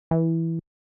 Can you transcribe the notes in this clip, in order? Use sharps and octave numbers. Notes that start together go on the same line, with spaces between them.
E3